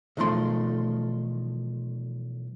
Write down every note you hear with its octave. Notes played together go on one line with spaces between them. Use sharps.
B1 E2 D#3 F3 A3 C6